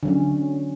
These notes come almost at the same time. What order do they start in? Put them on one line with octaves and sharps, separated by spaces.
D3 F#3 C#4